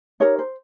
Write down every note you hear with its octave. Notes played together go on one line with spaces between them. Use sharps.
D#4 G4 A#4 C#5
C5